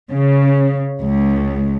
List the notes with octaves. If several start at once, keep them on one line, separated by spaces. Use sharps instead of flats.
C#3
C#2